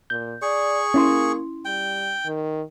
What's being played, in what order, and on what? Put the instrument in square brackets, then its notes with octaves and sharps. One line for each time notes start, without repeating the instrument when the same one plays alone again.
[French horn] A#2 [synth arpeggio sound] G6
[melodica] G#4 C#6 [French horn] D5
[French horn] A#3 [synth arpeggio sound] C#4 E4 C6
[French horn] G3 [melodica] G5
[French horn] D#3